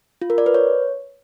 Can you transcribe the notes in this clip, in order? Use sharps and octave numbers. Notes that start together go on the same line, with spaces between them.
F4
A#4
D5
B4
C#5